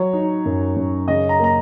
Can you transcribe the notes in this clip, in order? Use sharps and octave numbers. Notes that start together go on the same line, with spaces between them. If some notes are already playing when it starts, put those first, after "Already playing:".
Already playing: F#3 C#5
D#4
F#2
F#2
C#3 D#5
A#5
A#3 A#5